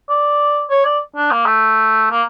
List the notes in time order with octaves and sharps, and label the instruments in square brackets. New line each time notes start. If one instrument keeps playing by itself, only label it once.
[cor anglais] D5
C#5
D5
D4
A#3
A3
A#3